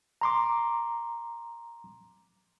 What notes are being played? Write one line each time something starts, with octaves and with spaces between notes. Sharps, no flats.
A#5 C6 D6